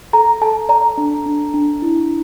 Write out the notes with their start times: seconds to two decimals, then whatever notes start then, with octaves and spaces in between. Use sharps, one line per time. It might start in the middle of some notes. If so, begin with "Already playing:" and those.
0.13 A4 A#5
0.41 A4 A5
0.69 D5 A#5
0.97 D4
1.26 D4
1.54 D4
1.82 E4